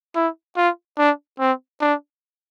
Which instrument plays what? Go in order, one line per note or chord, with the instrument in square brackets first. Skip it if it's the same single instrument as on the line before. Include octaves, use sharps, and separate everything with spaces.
[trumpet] E4
F4
D4
C4
D4